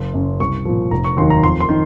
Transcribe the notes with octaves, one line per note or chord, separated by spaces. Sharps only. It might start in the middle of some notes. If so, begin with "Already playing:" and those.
Already playing: F#1 C6
F#2 C#3
C2 C#6
A#2 F3
F1 A#5
C#6
D#2 D#3 F#3 C6
A#5
F2 C6
C6
D#3